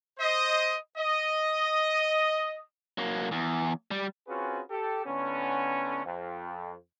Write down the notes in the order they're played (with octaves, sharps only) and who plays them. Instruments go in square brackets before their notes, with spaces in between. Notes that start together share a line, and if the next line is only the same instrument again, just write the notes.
[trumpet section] C5 D#5
D#5
[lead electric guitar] F#3 A#3
E2
G3
[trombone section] C4 C#4 F4 F#4 G#4 B4
G4 A4
A2 D3 B3 C#4
F2